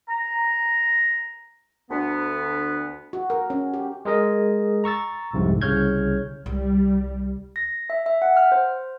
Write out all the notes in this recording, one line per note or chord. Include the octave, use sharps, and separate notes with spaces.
A#5
D2 B3
F#4
A#4
C#4
G4
G#3 G#4 A#4 D#5
A#5 C#6 E6 A6
C2 F2 G#2 C3
C2 C#3 C#5 F6 G6 G#6
C2 G3
A#6
E5
E5
F#5
F6
C5